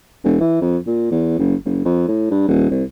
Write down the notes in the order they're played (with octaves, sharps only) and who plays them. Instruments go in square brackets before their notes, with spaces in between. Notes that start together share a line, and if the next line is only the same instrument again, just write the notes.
[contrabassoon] E1
E3
F2
A#2
E2
F#1
F#1
F2
A2
G2
D#1
C2